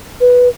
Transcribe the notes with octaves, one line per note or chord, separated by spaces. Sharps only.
B4